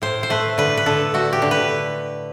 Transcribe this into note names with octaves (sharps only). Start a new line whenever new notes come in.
A2 C5
C5
A3 B4
D3 B4
B4
D3 A4
A3 F#4
G4
D3
B4